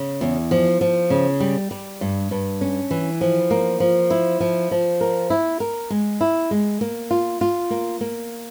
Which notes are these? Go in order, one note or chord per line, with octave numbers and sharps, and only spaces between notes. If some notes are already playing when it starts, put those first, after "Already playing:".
Already playing: C#3
E2
F3
F3
C#3
G3
G3
G2
G2
C#4
E3
F3
A#3
F3
E4
F3
F3
A#4
E4
A#4
G#3
E4
G#3
A#3
F4
F4
A#3
A#3